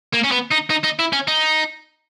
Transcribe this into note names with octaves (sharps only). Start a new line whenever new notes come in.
A#3
C#4
B3
D#4
D#4
D#4
E4
C#4
D#4